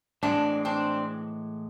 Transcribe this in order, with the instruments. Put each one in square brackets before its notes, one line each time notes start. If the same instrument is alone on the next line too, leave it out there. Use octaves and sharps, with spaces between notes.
[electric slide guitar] A2 E3 G#3 [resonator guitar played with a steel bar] C4 D4
[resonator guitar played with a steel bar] C4 D4